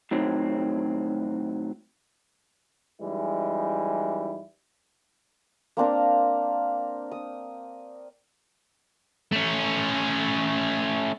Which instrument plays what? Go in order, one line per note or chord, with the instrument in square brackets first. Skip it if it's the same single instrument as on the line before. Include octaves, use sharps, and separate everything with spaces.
[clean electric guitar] A2 D#3 F#3 C4
[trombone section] F#2 E3 G3 G#3 D#4 E4
[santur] A#3 C4 D4 A#4
D#6
[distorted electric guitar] A3 C#4